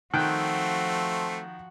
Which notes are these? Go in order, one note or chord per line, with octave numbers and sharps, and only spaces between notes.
D#3 F3 A3 C4 F#4 G5 F#6